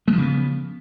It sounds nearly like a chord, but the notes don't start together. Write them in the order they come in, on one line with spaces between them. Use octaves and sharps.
G#3 F3 C#3 B3